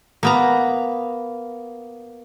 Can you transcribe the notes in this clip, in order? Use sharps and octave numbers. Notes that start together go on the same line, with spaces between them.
A#3 B3 A#5